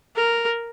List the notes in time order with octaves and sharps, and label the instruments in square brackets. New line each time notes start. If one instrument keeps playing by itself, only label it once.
[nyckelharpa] A#4